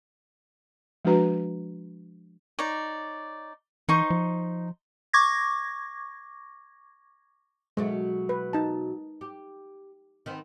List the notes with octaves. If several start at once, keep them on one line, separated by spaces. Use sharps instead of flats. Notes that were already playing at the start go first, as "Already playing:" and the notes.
F3 G#3 D4 F#4 B4 A#5
D#4 C#5 D5
E3 D#4 C5 C#6
F3
C#6 D6 G#6 A#6
B2 F#3 G#3 A3
B4
D#4 A5
G4
D#3 B3 C4